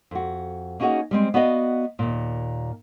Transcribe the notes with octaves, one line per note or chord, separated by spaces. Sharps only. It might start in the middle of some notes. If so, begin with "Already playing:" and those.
F2 F#4
A#3 C#4 D#4 F#4 G#4 F#5
G3 G#3 C4
B3 F#4 D5 D#5 F5
D#2 A#2